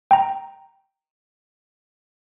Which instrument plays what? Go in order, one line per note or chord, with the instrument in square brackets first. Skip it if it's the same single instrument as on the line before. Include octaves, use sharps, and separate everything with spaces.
[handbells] G5 A#5